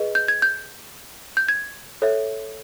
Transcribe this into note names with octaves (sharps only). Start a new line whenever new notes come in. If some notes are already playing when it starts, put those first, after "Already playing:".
Already playing: G#4 B4 D#5
G6
G#6
G6
G6
G#6
A4 C#5 E5